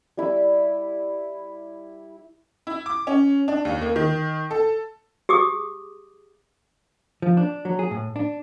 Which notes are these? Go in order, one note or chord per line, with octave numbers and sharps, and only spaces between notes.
G3 E4 E5
E4
D6
C#4
D4
D#2
A#3
D#3
A4
G4 G#4 D6 D#6
F3
D4
F#3
G#4
A2
D4